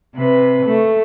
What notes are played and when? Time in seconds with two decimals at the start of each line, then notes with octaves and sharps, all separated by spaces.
0.16 C3 B4
0.66 A3